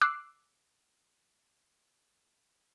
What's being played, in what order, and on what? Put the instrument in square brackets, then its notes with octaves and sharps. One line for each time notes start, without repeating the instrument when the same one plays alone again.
[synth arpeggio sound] D6 E6 F#6 C7